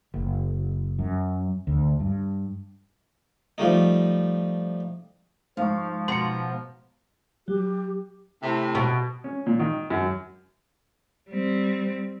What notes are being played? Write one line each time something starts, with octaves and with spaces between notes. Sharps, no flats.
F#1
F#2
D2
G2
F3 G3 A3 D#4
G#2 F3 F5 C#6
B2 B3 A#5 C6 C#7
F#3 G4
A2 C3
B2
C#4
A#2
D#3
F#2
G3 C4